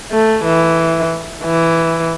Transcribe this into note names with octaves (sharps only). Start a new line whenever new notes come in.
A3
E3
E3